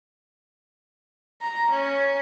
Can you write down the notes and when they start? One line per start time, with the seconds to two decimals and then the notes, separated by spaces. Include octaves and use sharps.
1.41 A#5
1.70 C#4